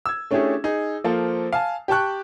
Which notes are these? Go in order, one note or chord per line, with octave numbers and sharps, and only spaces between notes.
E6 G#6
A3 C#4 D4 E4 G4 G#4
D#4 G#4
F3 A#3 F4 A4 C5
F5 G#5 A5
G4 G5 A5 C#6 F#6